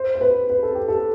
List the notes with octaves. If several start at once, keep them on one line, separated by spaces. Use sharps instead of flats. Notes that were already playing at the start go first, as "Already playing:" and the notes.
Already playing: C5
C5
B4
B4
A4
G4
A4